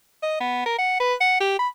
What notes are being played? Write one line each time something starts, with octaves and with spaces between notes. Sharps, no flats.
D#5
B3
A#4
F#5
B4
F#5
G4
B5